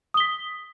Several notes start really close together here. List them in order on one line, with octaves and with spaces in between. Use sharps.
D#6 G7 B6